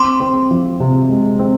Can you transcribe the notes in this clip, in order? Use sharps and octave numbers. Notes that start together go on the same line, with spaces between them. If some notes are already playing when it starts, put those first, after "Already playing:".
Already playing: C4 C6 D6
C4
F3
C3
G#3
C4